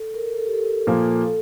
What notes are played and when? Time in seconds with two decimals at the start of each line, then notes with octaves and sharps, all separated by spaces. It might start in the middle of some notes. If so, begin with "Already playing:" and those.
Already playing: A4
0.14 A#4
0.37 A4
0.47 G4
0.53 A4
0.87 A#2 F3 A#3
1.27 A4